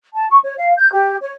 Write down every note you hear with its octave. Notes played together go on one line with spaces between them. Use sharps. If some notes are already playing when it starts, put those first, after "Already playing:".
A5
C#6
C#5
F5
G6
G4
C#5